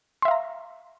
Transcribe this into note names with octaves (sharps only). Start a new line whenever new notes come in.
E5 F5 A#5 C6